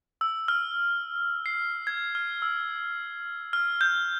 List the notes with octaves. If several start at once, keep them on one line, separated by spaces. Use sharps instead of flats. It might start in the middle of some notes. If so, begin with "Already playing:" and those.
E6
F6
C7
G#6
F6
E6
F6
G6